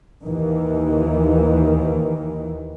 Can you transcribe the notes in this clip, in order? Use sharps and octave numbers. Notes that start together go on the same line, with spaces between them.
D#2 D#3 E3